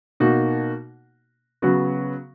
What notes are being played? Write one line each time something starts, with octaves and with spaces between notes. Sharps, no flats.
B2 A#3 D#4 F#4
C#3 F#3 B3 F#4